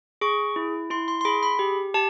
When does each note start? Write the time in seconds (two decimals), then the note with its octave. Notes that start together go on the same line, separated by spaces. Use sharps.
0.21 G#4 C#6
0.56 E4
0.90 E4 C6
1.08 C6
1.21 C6
1.25 G#4 B5
1.43 B5
1.59 G4
1.94 G4 A5